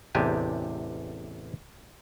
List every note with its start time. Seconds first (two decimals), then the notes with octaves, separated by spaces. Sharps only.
0.15 A1 E2 C3 D4 G4 G#5